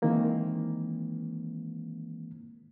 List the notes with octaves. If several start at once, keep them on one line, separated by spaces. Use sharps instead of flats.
D#3 E3 G#3 A#3 C4